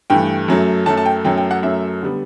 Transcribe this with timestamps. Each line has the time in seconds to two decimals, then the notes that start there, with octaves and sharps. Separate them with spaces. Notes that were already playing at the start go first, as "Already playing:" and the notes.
0.10 G2 E3 A3 G5
0.48 F#2 F#3 A3
0.86 F#2 F#3 A3 A5
0.97 A5
1.06 G5
1.24 F#2 F#3 A3 G5
1.37 G5
1.51 F#5
1.62 F#2 F#3 A3 E5
2.03 D3 G3 B3